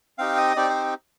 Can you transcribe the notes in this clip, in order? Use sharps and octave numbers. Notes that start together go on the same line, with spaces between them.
C4 D#4 G4 F5
D#5
C4 D#4 G4 D5
C5